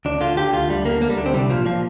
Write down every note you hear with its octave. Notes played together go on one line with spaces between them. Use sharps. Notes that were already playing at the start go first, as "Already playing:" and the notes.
D2 D4
D3 F4
D3 G4
D2 F4
D2 G3
D3 A#3
D3 A#3
G3
D2 D4
C4
C2 G3
A#2 F3
A#2 F3